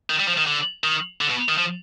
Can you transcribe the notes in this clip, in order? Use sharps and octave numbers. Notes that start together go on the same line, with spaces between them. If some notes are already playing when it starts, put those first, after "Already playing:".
D#3
G3
F3
D#3
D3
D#3
D3
B2
D#3
F3